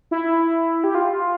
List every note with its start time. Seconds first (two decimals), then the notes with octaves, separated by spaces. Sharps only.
0.11 E4
0.84 G4
0.95 F4